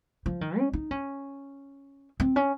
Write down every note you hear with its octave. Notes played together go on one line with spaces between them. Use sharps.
F3
D#3
C#4
D#4
C#4
C4
C#4